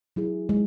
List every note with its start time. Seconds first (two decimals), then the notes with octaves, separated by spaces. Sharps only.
0.16 F#3 E4 G#4
0.49 G#3